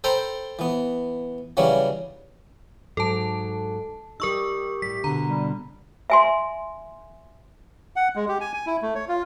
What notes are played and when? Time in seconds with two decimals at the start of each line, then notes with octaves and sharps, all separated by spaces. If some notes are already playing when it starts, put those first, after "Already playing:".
0.04 A4 C5 G5 A#5 B5
0.59 E3 B3
1.57 C#3 E3 F#3 G3 C#4
2.97 G#2 F#3 D#4 A4 A5
4.20 G3 D#4 G4 A#4 C#6 E6
4.82 A2 G3 B6
5.04 B2 D3 A#5
5.27 G3
6.10 E5 G#5 C6
7.96 F#5
8.15 G#3
8.28 G4
8.41 G#5
8.54 G#5
8.67 E4
8.82 A3
8.95 C#5
9.09 F4